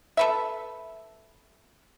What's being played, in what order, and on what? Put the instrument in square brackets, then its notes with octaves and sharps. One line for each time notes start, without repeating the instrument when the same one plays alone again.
[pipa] A4 B4 E5